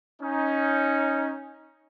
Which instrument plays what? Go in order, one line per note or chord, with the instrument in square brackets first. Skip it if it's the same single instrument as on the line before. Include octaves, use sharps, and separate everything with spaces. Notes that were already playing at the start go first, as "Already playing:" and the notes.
[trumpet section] C#4 D#4